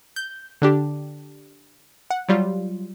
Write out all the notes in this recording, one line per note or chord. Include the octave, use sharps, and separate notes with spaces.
G6
D3 D4 G4
F#5
F#3 G3 F4